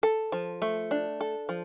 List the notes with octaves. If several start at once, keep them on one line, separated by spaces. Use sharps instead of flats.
A4
F3
A3
D4
A4
F3